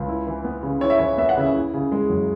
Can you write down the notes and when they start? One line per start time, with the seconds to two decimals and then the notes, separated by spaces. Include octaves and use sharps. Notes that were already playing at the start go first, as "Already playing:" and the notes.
Already playing: C#2
0.08 E4
0.27 E3
0.44 B3
0.63 C#3
0.81 E4 C#5
0.90 E5
0.99 E3 C#5
1.17 B3 E5
1.29 F#5
1.37 C#3 E5
1.54 E4
1.74 C#3
1.92 G#3
2.10 F#2